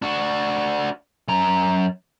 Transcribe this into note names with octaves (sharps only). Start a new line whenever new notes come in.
D4 F#4
F#2 A#5